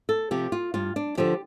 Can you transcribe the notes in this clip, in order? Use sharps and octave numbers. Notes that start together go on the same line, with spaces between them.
A4
C3 F3 G4
F4
G2 F4
D4
D3 F3 G4